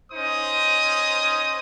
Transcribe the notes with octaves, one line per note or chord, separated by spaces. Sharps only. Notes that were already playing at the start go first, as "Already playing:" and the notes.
C#4 D#4 C5 D#6